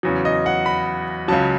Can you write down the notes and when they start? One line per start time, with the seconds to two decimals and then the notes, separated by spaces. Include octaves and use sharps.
0.03 E2 C#3 F#3
0.25 D#5
0.46 F#5
0.66 B5
1.28 C#2 C#3 F#3 A5